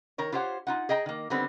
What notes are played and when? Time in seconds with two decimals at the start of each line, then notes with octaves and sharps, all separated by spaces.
0.18 D#3 A#4 C#5
0.32 F4 G4 C5 C#5 F#5
0.67 D#4 F4 F#5
0.89 G#4 D#5 G5 A#5
1.06 D#3 A#3
1.30 D3 D#3 G3 B3 C4